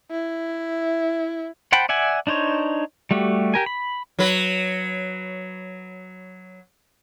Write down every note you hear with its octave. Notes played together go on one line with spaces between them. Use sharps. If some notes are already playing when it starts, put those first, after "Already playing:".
E4
C5 F#5 G5 A5 B5
D5 E5 F#5 G#5
D4 D#4 C5 C#5
G3 A3 F#4 G4
G4 A#4 G#5
B5
F#3 B4